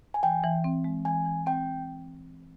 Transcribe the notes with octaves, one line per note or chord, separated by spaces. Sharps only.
G#5
E3 G5
E3
C4
G#3
E3 G#5
E3
C4 G5